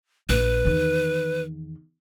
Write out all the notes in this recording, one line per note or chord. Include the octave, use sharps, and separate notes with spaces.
A#1 B4
E2 D#3